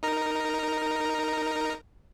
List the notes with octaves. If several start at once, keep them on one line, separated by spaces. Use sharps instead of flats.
D#4 A#4 A#5